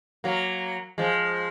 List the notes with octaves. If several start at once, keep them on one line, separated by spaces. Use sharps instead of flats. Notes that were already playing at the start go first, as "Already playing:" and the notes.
F#3 A#3
F3 G#3